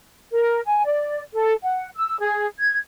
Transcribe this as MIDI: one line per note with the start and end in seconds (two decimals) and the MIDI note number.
0.32 0.60 70
0.66 0.82 80
0.85 1.21 74
1.34 1.54 69
1.63 1.88 78
1.95 2.17 88
2.20 2.45 68
2.60 2.78 92